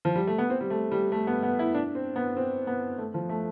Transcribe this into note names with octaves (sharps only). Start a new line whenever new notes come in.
F3
G3
A3
B3
C4
G3
A3
G3
A3
B3
B3
E4
D4
C4
B3
C4
B3
A3
F3
A3